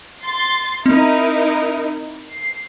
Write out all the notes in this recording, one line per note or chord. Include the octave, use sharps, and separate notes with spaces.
C6 A6
C4 D#4 E4 A#4
C7